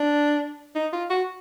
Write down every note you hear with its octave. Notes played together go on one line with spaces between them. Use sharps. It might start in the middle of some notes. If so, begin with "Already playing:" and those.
Already playing: D4
D#4
F4
F#4